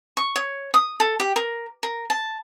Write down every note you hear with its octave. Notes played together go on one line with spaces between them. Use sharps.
C#6
C#5
D#6
A4
G4
A#4
A#4
A5